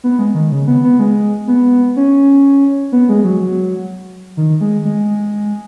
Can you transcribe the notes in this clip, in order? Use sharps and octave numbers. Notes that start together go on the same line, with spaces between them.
B3
G#3
D#3
C#3
B3
B3
G#3
B3
C#4
B3
G#3
F#3
F#3
D#3
G#3
G#3